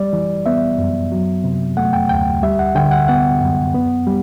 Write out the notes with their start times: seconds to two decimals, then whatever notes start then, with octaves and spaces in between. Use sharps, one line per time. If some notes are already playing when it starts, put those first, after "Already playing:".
Already playing: G3 D5
0.13 E3
0.46 B3 E5
0.78 F#2
1.12 F#3
1.44 C3
1.77 A3 F#5
1.93 G5
2.09 D2 G5
2.43 G3 E5
2.59 F#5
2.75 D3 G5
2.91 F#5
3.08 B3 F#5
3.41 F#2
3.74 B3
4.07 G3